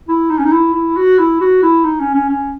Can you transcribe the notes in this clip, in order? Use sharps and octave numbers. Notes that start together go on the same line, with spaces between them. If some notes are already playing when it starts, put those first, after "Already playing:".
E4
D#4
C#4
D#4
E4
E4
F#4
E4
F#4
E4
D#4
C#4
C#4
C#4